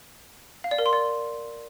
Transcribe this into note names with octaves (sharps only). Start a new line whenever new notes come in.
F5
D5
A#4
C6
D5